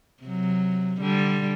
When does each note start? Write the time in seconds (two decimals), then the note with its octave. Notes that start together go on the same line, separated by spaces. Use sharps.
0.23 C3 F#3
1.01 D3 G3